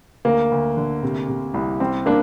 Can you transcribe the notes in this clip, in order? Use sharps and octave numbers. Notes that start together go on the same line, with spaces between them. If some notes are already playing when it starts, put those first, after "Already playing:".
D2 A#3
D2
D3
C3
C3
C2
G3 C4
G3 A#3 D4